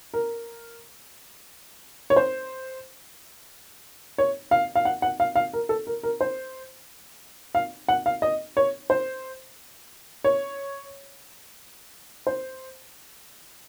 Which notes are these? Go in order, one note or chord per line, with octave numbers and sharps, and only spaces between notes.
A#4
C#5
C5
C#5
F5
F5
F#5
F#5
F5
F5
A#4
A4
A#4
A#4
C5
F5
F#5
F5
D#5
C#5
C5
C#5
C5